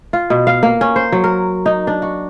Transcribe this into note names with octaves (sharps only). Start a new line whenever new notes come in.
F4
B2
F5
A#3
C#4
C5
F#3
A#4
D#4
D4
F#4